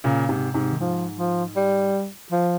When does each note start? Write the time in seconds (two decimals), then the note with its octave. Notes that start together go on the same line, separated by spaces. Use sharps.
0.04 A#2 C#3
0.29 G#2 C3
0.54 G#2 C3
0.70 D#3
0.80 G#2 F3
1.18 F3
1.56 G3
2.32 F3